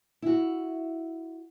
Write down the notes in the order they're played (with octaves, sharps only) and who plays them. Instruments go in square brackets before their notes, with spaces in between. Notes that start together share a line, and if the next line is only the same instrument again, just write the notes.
[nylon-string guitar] E4 F#4